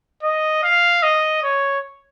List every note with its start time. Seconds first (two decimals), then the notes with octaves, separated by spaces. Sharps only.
0.23 D#5
0.63 F5
1.03 D#5
1.43 C#5